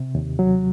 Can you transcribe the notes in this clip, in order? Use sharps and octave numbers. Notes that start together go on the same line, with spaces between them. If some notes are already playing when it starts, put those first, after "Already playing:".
Already playing: C3
D#2
F#3